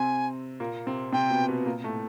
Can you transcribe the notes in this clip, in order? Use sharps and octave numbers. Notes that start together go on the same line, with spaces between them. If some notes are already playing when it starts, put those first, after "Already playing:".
Already playing: C3 C4 G#5
A#2 A#3
C3 C4
C3 C4 G5
B2 B3
B2 B3
A#2 A#3
A2 A3